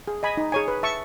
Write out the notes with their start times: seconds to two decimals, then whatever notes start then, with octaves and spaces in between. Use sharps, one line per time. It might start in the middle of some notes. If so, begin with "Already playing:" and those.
0.08 G#4
0.23 D#5 G#5 B5
0.37 D#4
0.52 G#4 C#5 G#5
0.68 B4
0.83 E5 A5 C#6